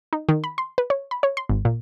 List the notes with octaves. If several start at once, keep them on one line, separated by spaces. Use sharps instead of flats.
D#4
D#3
B5
C6
B4
C#5
B5
C#5
C6
G#1
A#2